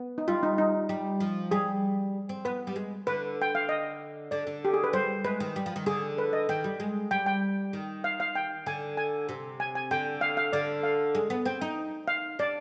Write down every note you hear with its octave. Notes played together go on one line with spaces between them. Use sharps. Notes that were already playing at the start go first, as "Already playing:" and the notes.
Already playing: B3
D#4
G3 F4
D#4
D#4
G3
F3
G3 G#4
C4
B3 B4
G3
G#3
D3 B4
G5
F5
D#5
D3 D5
D3
G4
G#4
B4
G3 C5
G#3 B4
D#3
G3
F3
D#3
D3 G#4
B4
D#5
D#3 G5
G3
G#3
G3 G5
G5
D#3
F5
F5
G5
D3 G#5
G#5
C3
G#5
G#5
D3 G5
F5
F5
D3 D5
F5
G#3
B3
C4 G5
D#4
F5
D4 D5